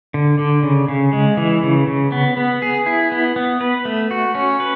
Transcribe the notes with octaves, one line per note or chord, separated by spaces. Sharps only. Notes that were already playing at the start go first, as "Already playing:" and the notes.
D3
D3
C#3
C#3
G#3
E3
C#3
C#3
B3
B3
G#4
E4
B3
B3
B4
A3
F#4
C#4
B4